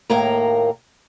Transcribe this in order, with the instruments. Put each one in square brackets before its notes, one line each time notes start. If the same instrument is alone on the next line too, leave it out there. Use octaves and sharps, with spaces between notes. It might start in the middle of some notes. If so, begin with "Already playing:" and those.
[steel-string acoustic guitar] D#2 A2 A#3 A#4 F5 A#5